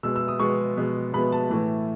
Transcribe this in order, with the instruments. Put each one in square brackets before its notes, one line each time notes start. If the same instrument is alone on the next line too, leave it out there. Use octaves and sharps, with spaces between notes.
[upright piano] B2 G#3 B3 E6
E6
D#6
B2 G#3 B3 C#6
B2 G#3 B3
B2 G#3 B3 B5
A5
A2 E3 A3